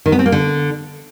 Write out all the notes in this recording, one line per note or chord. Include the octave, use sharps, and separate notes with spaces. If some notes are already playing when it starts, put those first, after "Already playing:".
D#3
B3
C4
A#3
D3